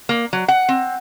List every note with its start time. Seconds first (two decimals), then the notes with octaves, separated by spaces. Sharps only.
0.09 A#3
0.33 F#3
0.48 F#5
0.69 C4